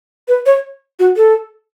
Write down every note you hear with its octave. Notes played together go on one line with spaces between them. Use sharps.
B4
C#5
F#4
A4